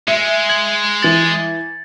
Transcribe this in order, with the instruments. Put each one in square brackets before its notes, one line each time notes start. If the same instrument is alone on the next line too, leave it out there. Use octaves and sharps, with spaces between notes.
[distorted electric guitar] G#3 [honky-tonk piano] E5 [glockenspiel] C#7
[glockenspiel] G#6 F#7
[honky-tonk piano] E3 F#7 [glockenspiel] A6